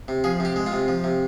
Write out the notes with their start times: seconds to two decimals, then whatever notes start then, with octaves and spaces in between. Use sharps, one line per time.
0.08 C3
0.24 F3 G#4
0.40 C3 G4
0.56 G#3
0.66 F4
0.72 C3
0.88 F3
1.04 C3